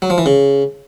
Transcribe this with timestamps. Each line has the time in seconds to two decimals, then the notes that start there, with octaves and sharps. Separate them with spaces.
0.02 F#3
0.10 F3
0.18 E3
0.26 C#3